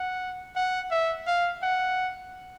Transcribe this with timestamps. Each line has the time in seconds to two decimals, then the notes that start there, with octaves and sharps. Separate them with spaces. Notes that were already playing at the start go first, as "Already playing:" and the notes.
Already playing: F#5
0.56 F#5
0.91 E5
1.27 F5
1.62 F#5